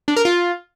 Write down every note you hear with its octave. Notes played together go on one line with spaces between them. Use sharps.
D4
A#4
F4